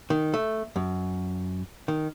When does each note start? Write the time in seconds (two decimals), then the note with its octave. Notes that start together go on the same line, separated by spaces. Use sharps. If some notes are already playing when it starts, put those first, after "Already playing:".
0.10 D#3
0.34 A3
0.76 F#2
1.88 D#3